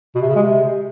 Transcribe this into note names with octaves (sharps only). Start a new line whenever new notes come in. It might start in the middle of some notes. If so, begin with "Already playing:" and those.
B2
C3
C#3
G#3
C3